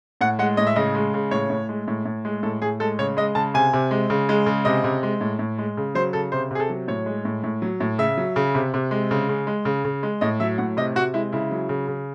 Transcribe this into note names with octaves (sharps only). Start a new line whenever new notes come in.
A2 F#5
G#3 F#5
A2 D#5
E5
C#3 D#5
G#3
C#3
A2 C#5
A2
G#3
A2
A2
G#3
A2 A4
A2 G#4
G#3 A4
C#3 C#5
G#3 D#5
C#3 A5
C3 G#5
C3
G#3
C#3
G#3
C#3
C3 D#5
C3
G#3
A2
A2
G#3
C#3
F#3 C5
C#3 A4
C3 C5
C3 G#4
A4
F#3
A2 C#5
G#3
A2
A2
F#3
A2
C#3 E5
F#3
C#3
C3
C3
G#3
C#3
C#3
G#3
C#3
C#3
G#3
A2 D#5
F#3 E5
A2 F#5
C3 D#5
C3 F#4
G#3 E4
C#3 E4
F#3
C#3
C#3